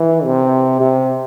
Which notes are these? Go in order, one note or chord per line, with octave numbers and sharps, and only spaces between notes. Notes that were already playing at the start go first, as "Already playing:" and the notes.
Already playing: E3
C3
C3